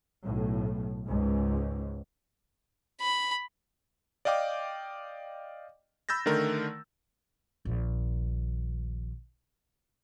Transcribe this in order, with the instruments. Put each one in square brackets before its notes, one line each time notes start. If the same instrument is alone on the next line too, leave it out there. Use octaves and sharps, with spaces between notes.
[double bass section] B1 A2
C#2 G#2
[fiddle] B5
[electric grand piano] D5 D#5 F5 G5 D6
B5 E6 G6 A6 A#6
D3 D#3 A3 A#4
[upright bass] A#1 D#2